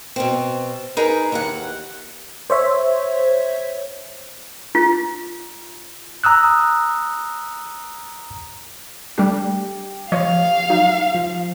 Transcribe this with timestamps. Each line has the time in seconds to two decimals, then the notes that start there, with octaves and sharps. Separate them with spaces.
0.16 B2 C4
0.97 D#4 G#4 A#4 B4
1.32 D#2 E3 F#5
2.50 C5 C#5 E5
4.75 F4
6.24 A#5 D#6 E6 F#6
9.18 G3 A3 D4 G4
10.12 F3 C#5 D#5 F5
10.70 F#3 D#4
11.15 F3